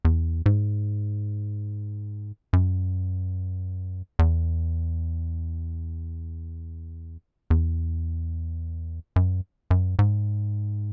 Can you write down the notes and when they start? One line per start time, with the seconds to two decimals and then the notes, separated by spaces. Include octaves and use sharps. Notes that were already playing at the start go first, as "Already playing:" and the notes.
0.05 E2
0.46 G#2
2.53 F#2
4.19 E2
7.50 E2
9.16 F#2
9.71 F#2
9.99 G#2